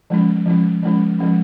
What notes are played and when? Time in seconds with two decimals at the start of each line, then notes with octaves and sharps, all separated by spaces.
0.10 F3 G#3 C#4
0.46 F3 G#3 C#4
0.83 F3 G#3 C#4
1.19 F3 G#3 C#4